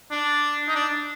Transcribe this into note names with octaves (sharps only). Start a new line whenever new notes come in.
D4
D#4
D4